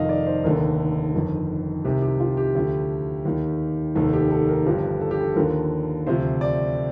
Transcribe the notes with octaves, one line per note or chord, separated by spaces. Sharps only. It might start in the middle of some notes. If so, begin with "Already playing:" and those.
Already playing: F1 F2 D#3 D#5 F5
D5
C5
F1 D#2 D3 A#4
G1 F2 D#3
C2 C3 D#3 G4
G4
F4
G4
D2 D3 F3
D#2 D#3
F1 D#2 D#3 A4
G4
A4
A#4
G1 G2 F3 G4
A4
G4
A4
D#2 D3 F3 A#4
D2 C3 F3 C5
D5